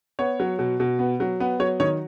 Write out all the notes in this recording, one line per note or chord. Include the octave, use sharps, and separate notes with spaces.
B3 C#5
F#3
B2
B2
B3
F#3
B3 B4
F#3 C#5
D#3 C#5